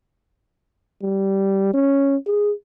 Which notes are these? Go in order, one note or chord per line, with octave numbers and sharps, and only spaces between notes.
G3
C#4
G#4